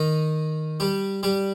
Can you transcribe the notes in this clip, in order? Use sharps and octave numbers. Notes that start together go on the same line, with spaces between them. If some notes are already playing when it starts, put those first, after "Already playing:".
Already playing: D#3 D#4
G3 G4
G3 G4